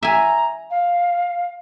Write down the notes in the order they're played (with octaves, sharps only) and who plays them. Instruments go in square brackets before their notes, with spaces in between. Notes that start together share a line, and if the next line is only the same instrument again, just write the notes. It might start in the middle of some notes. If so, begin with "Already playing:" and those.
[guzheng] E5 G#5 [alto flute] A#5
[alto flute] F5